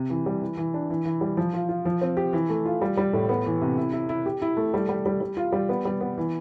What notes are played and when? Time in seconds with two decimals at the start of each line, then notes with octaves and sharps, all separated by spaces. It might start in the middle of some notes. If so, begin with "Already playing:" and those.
Already playing: C3
0.10 E3
0.26 G3
0.41 E3
0.57 E3
0.74 D4
0.90 E3
1.05 E3
1.21 G3
1.37 F3
1.54 F4
1.69 F4
1.85 F3
2.01 C4
2.17 G4
2.33 E3
2.50 A3
2.65 F4
2.82 G3
2.97 G3
3.13 A2
3.29 B3
3.46 E3
3.62 C3
3.77 E4
3.93 E4
4.09 E4
4.26 G4
4.42 E4
4.57 A3
4.74 G3
4.89 G3
5.06 G3
5.21 G3
5.37 F4
5.52 G3
5.69 B3
5.85 G3
6.01 B3
6.17 E3